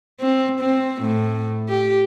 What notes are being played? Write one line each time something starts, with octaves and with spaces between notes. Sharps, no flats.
C4
C4
A2
G4